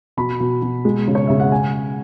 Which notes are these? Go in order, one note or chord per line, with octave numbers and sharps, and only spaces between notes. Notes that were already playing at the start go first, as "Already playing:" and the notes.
B2 B5
B2
B2
G#3
C#3
C#5
C#3 E5
F#5
G#5